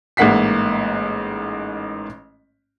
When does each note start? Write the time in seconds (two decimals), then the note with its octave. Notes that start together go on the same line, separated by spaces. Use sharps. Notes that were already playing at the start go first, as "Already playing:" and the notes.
0.17 A1 G#2 A#3 F#5 B6 C7